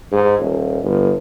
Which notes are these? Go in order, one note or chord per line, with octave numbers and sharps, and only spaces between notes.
G#2
D#1
G1